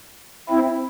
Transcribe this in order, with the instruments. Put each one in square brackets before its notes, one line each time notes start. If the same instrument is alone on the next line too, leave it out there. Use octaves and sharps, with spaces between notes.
[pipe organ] C4 E4